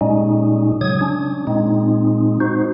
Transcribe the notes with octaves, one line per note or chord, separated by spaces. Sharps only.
A#2 G3 G#3 C#4 D#4
C#3 F#3 D#6 G#6
C#4 D4
A#2 G#3 C4 D#4
D#4 F#4 C5